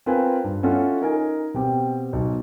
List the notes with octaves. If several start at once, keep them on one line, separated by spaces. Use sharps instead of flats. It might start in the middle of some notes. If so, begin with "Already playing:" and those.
C4 F4 A#4 B4 F5 G#5
G2
C#4 E4 F4 A4 F5 F#5
D#4 A#4 G#5
B2 C4 G4
B1